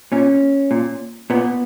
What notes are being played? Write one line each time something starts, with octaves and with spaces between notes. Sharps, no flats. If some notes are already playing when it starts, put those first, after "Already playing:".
A#2 C#4
A#2
A#2 B3